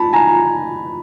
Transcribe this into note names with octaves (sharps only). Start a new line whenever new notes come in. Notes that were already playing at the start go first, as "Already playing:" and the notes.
Already playing: A5 B5
G#5 A#5